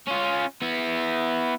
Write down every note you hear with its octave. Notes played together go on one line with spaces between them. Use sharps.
C#4 F4
B3 E4